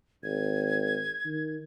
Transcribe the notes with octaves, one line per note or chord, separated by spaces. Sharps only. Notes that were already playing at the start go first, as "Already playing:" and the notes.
G#1 G#6
D#3